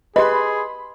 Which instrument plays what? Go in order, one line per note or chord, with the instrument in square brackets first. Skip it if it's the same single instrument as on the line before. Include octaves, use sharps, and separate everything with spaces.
[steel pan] G4 B4 [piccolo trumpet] G#4 [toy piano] D#5 [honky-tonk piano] B5 C6